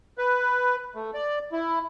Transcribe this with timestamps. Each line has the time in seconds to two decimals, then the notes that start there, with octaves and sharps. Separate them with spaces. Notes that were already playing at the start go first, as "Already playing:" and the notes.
0.18 B4
0.95 A3
1.14 D5
1.52 E4